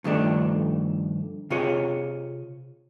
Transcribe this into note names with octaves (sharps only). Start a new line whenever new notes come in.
G2 D#3 F3 A3 D4
C3 F4 G#4 C#5